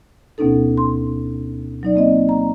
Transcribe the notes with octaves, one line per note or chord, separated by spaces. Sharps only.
D2 B2 B3 C#4 D#4 A4
C6
F#3 D#4 D5
A#3 C4 D#5
A#5